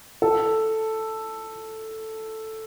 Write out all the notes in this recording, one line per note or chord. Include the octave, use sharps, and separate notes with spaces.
A4